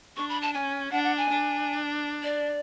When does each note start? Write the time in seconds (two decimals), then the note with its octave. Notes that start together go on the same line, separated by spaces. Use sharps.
0.17 D4 C#6
0.29 B5
0.42 A5
0.54 C#4 G#5
0.92 D4 F#5
1.04 F#5
1.17 G#5
1.29 D4
2.23 D5